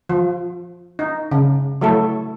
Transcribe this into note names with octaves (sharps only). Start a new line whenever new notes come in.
F3
D#4
C#3
F#3 A3 E4 A4